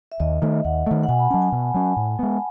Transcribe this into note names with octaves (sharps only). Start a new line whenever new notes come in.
E5
D#2 D#5
D#3 A3 E5
D#2 F#5
D#3 A3
F#5
B2 G#5
B5
F#3 C#4 A5
G#5
B2
F#3 C#4
A2
G#3 B3